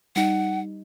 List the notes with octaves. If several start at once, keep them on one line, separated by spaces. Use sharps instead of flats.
G3 D#4 F#5